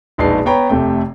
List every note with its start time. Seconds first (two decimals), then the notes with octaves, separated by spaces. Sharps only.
0.18 E1 A#1 D#4 B4 A5 C7
0.46 B3 C#5 G5 A#5 B5
0.69 F1 C3 A3 G5